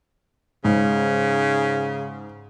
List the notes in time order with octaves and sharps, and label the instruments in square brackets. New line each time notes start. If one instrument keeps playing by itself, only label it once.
[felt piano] G#2 [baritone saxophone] C#3